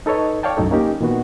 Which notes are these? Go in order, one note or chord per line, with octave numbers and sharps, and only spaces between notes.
D#4 A4 B4 C#5 D#5
C#5 D5 F5 G5 A5
C2 F#2 A2 D#4 A4
A#3 C#4 D#4 G4 A#4
A#2 D#3 B3 F#4